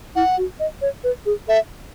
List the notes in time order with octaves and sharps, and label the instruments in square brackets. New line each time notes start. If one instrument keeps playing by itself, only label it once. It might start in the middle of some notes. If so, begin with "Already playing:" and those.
[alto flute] E4 [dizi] F#5
[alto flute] F#4
D#5
C#5
B4
G#4
[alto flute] A4 [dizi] E5